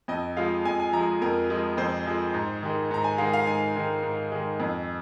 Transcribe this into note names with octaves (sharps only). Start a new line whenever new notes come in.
F2 D#5
F3 G#3 F5
F2 G#5
G#5
F3 G#3 A#5
F2 A#4
F3 G#3
F2 C5
F3 G#3
G#2
D#3 G#3
G#2 A#5
G#5
D#3 G#3 F5
F5
G#2 G#5
D#3 G#3
G#2
D#3 G#3
F2